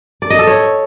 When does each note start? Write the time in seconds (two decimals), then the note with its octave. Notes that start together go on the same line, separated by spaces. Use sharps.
0.22 D5
0.30 D#5
0.39 A4
0.47 C#5